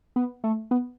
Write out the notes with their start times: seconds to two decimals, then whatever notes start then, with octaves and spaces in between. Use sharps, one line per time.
0.16 B3
0.44 A3
0.71 B3